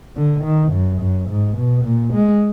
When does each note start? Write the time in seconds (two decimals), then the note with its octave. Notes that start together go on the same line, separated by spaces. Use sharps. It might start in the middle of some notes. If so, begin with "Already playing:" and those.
0.16 D3
0.44 D#3
0.72 F#2
1.01 F#2
1.29 G#2
1.57 B2
1.84 A#2
2.13 G#3